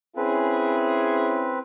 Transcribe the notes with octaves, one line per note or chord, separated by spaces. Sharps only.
C4 C#4 E4 G#4 B4